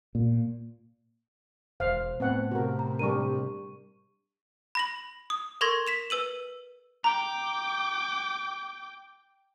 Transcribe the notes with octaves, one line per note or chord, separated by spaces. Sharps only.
A#2
E1 C5 F5
A2 B3 C4 F#5
C3 F#4 A#4
A#5
G3 D4 A#4 C#6 D#7
B5 A#6 F#7
D#6
A4 A#4 C6 C#6 G#6 A#6
B6 E7 F7
B4 E6 D#7 F#7
G5 A#5 D6